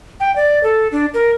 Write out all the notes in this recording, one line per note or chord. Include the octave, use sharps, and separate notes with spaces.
G5
D5
A4
D4
A#4